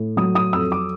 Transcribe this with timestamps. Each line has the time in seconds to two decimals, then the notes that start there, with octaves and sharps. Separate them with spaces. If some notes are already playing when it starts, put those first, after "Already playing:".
Already playing: A2
0.17 F#3 D#6
0.35 D#6
0.53 F2 E6
0.72 D6